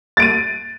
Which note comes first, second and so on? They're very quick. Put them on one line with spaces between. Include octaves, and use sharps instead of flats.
A6 D7 D#7